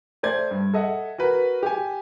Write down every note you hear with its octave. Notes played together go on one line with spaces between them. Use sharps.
A3 C5 D5 G#6
G2
A4 D#5 E5 F#5
F#4 A#4 B4
G4 G#5